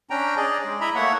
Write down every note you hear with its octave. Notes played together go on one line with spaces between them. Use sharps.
C#4 D4 G5 A#5
G#4 D5 D#5
G#3
E4 D#5 E5 A#5 B5
A3 A#3 C#5 E5 F#5